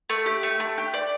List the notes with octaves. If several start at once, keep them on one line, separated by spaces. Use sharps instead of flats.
A3
G4
A3
A3
G4
D5